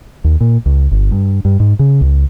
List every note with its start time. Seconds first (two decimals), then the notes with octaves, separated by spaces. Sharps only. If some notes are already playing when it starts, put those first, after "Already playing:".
0.24 D#2
0.41 A#2
0.66 C#2
0.91 G1
1.11 G2
1.45 G2
1.60 G#2
1.79 C#3
2.01 C#2